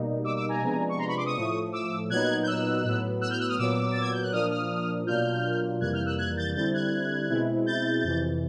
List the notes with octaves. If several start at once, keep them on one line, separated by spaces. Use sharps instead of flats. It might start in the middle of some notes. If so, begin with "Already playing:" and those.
Already playing: B2 G3 A#3 D#4
D6 E6
D6 E6
G#5 A#5
C3 F3 G#3 B3 D4
C#6
A#5 C6
B5 C#6
C6 D6
C#6 D#6
A2 F3 A3
D6 E6
A#2 F#3 B3 D#4 F#6 G#6
G6
E6 F#6
A2 F#3 B3
E6 F#6
F6 G6
E6 F#6
D#6 F6
A#2 F#3 B3 D6 E6
A6
G#6
G6
F#6
A#2 F3 A#3 D4 D#6 F6
D#6 F6
B2 F#3 A#3 D4 F4 F6 G6
F2 C3 E3 G3 A#3 F#6 G#6
F6 G6
E6 F#6
F#6 G#6
G6 A6
D3 G3 C4 E4 G6 A6
F#6 G#6
B2 G#3 C4 E4
G6 A6
F2 C3 E3